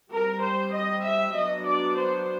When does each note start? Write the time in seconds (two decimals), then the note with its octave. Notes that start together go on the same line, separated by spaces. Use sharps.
0.10 G3 C4 A#4
0.41 C5
0.73 D#5
1.04 E5
1.34 F#3 B3 D4 D#5
1.66 D5
1.97 C5